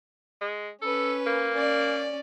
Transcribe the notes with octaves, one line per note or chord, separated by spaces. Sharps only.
G#3
C#4 A4 B4
A#3
C#4 D5